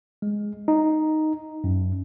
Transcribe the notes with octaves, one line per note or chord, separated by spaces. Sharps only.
G#3
D#4
F#2